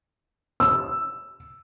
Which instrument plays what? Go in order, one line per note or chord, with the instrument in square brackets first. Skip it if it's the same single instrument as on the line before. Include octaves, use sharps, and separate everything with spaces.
[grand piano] E6